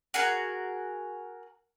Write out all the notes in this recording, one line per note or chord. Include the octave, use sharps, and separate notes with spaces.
F#4 G#4 A#4